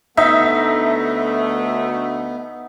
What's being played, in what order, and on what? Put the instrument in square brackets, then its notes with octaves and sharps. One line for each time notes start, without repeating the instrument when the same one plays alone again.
[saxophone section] D2 A3 [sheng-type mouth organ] B3 [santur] D#4 [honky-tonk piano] E5